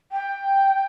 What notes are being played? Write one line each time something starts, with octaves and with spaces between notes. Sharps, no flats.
G5